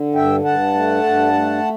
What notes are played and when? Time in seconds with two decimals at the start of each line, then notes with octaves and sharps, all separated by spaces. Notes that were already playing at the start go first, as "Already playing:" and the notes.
Already playing: D3
0.15 G2 E5 G5
0.45 G2 F#5 A5
0.74 A3
1.03 G2
1.33 A3